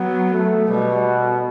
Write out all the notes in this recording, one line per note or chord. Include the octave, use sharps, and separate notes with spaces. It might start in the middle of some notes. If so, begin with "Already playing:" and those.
Already playing: F#3 B3
A3
B2 G3